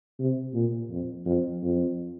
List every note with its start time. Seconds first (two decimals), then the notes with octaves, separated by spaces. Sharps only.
0.19 C3
0.54 A#2
0.90 F2
1.26 F2
1.63 F2